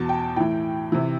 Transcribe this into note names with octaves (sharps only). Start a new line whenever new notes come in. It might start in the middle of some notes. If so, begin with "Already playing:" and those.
Already playing: E2 B2 A5
G5
A2 E3 G5
C3 E3